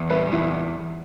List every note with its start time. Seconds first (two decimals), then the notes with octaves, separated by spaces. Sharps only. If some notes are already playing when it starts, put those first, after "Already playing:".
Already playing: E2
0.10 G3 B4 E5
0.32 E2 E4